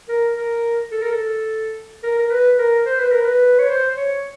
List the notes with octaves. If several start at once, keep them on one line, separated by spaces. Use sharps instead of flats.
A#4
A#4
A4
A#4
A4
A#4
A#4
B4
A#4
C5
B4
A#4
B4
C#5
C5
C#5